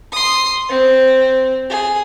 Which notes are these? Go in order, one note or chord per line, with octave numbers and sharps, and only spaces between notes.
C6 D#6
C4
G#4